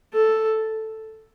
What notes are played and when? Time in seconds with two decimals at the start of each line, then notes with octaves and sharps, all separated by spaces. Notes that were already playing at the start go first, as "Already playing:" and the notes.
0.14 A4